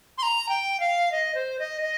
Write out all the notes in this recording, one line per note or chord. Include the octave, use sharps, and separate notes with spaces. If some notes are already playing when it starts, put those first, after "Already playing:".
C6
A#5
G5
F5
D#5
C5
D#5
D#5